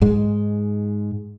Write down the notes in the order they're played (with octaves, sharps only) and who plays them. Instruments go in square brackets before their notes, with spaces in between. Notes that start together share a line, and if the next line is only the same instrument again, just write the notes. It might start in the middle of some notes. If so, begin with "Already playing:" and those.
[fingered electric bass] G#2 G#3